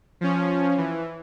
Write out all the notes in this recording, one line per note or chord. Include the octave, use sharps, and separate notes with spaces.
F3 C#4
E3